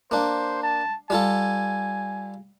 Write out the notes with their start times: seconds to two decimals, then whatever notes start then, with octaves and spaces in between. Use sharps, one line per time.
0.11 A#3 D4 C5
0.63 A5
1.10 G3 F4 A4 G#5